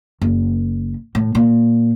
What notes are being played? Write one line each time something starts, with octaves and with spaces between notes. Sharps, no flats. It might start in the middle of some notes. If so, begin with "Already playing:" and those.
F#1
A2
A#2